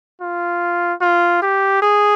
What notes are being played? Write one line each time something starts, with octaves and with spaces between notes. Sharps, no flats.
F4
F4
G4
G#4